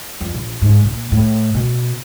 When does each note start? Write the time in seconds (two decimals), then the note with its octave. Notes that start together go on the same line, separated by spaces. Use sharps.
0.21 F2
0.34 A#1
0.62 G#2
0.85 A#2
1.12 A2
1.54 B2